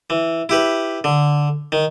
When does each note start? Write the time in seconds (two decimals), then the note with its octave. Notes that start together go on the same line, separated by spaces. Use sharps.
0.10 E3
0.49 E4 G4 B4
1.04 D3
1.72 D#3